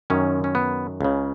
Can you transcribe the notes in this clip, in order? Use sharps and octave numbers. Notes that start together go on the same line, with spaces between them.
F#2 D#3 C#4
C#4
B3
C#2 C#3